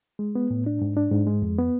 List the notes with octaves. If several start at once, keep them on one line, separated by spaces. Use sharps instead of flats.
G#3
B3
A2
D4
G#2
D4
G#2
G#3
F2
B3